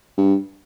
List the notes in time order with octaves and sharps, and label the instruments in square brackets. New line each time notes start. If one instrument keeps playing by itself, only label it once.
[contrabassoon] G2